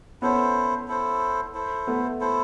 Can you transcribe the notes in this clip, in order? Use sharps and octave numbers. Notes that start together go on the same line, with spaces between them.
B3 C#4 E4 A4 C5
E4 A4 C5
E4 A4 C5
A3 B3
E4 A4 C5